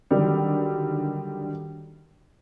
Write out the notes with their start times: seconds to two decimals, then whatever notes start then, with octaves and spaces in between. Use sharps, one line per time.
0.10 D3 D#3 F#3 G3